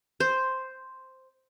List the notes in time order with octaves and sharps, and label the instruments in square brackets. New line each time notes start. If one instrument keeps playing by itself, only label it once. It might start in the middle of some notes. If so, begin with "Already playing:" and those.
[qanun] C5